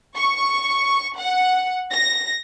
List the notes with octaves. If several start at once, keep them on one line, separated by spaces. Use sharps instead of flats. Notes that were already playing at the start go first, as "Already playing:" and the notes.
C#6
F#5
A#6